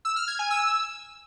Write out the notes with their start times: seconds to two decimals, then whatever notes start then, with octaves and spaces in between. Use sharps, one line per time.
0.05 E6
0.16 F6
0.28 G#6
0.39 G#5
0.50 E6